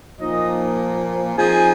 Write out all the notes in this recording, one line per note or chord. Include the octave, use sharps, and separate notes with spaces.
A#2 F3 A#3 D#4 D#5
F3 C4 D#4 G#4 G#5